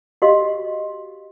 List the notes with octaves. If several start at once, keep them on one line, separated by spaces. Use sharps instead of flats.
F#4 G4 D#5 F5 C6